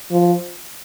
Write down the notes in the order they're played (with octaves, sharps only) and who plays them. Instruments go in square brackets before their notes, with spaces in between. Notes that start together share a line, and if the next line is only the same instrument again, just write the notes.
[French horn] F3